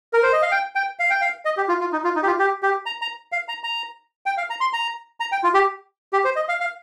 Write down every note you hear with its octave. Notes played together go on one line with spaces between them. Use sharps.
A#4
C5
D#5
F5
G5
G5
F5
G5
F5
D#5
G4
F4
F4
D#4
F4
D#4
G4
F4
G4
G4
A#5
A#5
F5
A#5
A#5
G5
F5
A#5
C6
A#5
A#5
G5
F4
G4
G4
C5
D#5
F5
F5